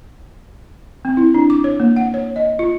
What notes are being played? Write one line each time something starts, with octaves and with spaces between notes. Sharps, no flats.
C4
E4
D4
D6
C#5
A#3
F#5
C#5
D#5
F4